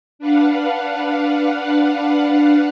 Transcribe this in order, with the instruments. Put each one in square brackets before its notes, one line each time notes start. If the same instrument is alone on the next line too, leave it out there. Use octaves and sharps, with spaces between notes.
[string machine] D4 B4 F5 F#5